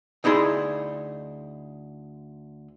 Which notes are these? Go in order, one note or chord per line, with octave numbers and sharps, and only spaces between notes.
D2 D#4 E4 G#4 C6